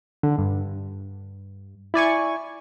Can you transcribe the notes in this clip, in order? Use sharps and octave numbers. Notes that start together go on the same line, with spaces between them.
D3
G2
E4 D5 G#5 C#6